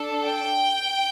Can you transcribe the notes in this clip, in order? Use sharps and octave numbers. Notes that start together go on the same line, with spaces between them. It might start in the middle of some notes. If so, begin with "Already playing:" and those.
Already playing: D4 A4
G5